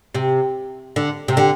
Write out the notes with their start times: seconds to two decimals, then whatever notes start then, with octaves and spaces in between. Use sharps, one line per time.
0.15 C3
0.96 D3
1.28 C3
1.37 D3